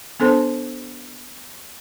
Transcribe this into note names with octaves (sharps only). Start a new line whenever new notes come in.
B3 D4 A4 C5 A5